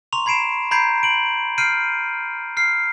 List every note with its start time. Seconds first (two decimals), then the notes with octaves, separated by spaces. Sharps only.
0.13 A#5 C6 C#6 F7
0.26 B5 G#6 C7 D7 E7
0.71 A#5 B5 G6 G#6 C7 D7
1.03 D7 F#7
1.58 F6 G6 C7 D7 D#7
2.57 F6 C7